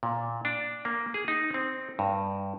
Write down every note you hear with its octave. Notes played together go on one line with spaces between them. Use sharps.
A#2
D4
A#3
G#4
D#4
C4
G2